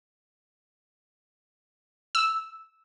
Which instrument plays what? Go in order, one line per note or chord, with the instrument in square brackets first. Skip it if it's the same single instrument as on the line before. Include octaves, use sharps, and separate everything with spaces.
[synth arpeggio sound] E6